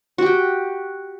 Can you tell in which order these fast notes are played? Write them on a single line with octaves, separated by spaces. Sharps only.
F#4 G4 G5